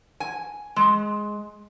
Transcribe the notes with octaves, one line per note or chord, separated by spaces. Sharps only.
G#5
G#3